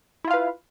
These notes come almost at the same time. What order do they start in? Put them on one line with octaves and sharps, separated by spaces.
E4 F4 F5 B4